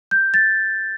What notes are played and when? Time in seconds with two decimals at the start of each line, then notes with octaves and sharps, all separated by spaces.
0.11 G6
0.34 A6